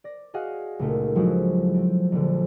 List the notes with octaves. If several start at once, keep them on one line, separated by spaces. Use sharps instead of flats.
D5 A#6
F#4 G#4 D#5 F5 F#5
C#2 A#2 A3 D#4
F3 F#3 G#3 E4 F#4
C4
A#1 D3